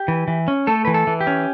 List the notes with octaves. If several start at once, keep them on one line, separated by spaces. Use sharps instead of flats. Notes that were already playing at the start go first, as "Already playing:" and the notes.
Already playing: G4
E3
E3
C#4
A3 A4
E3 B4
A4
E3
G4
C#4